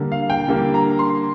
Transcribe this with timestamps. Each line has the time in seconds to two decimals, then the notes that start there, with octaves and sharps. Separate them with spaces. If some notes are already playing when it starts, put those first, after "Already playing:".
Already playing: D3 G3 A#3
0.12 F5
0.30 G5
0.48 D3 G3 A#3
0.74 A#5
0.99 C6